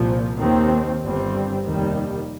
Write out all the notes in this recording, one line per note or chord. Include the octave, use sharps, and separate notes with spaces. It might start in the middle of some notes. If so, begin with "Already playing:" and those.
Already playing: C2 A#2 F3
D#2 D#3 C4
G1 G2 G3 C4
F1 D#2 D#3 G3